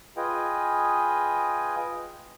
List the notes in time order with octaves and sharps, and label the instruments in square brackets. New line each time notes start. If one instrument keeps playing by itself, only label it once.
[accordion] F4 G#4 B4 D#5 G5 G#5